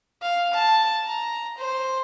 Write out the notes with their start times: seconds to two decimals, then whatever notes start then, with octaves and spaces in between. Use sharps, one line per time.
0.22 F5
0.54 A5
1.06 A#5
1.58 C5